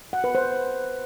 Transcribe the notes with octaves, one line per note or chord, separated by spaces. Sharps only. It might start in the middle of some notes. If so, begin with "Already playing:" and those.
F#5
B4
C5